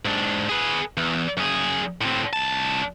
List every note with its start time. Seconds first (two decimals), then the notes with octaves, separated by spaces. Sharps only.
0.05 G#2 D4
0.49 G#4 B4
0.97 E2
1.37 F#2 G#4
2.01 A2 C4
2.33 C2 A5